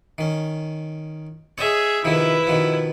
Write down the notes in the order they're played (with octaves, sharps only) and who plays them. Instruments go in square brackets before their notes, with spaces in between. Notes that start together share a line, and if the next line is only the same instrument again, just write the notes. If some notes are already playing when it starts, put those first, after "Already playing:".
[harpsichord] D#3 C#4
[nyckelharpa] G#4 E5 [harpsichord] C#5 D#5
[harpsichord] C3 D#3 F3 [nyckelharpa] E4 B4
[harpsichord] B2 D#3 F3